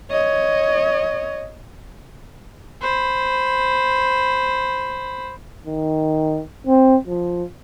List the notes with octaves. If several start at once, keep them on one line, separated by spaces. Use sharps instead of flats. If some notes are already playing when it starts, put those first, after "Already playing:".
C#5 D#5
C5 B5
D#3
C4
F3